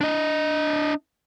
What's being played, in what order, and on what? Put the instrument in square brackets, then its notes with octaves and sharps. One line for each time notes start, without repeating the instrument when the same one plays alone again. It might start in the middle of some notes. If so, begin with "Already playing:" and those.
[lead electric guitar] D4 D#5